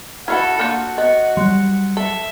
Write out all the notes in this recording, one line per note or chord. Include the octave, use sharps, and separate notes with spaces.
E4 F#4 A4 F5 F#5 B5 F6 G#6
A#3 D4 F4 F#4 G6
B3 D#5
F#3 G3 C6 F#6
A4 E5